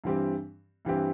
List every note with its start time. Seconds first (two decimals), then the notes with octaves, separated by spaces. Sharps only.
0.04 G2 E3 G3 C4 G4
0.85 G2 E3 G3 C4 G4